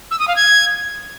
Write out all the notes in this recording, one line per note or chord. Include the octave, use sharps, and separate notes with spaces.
E6
D#6
F5
G#6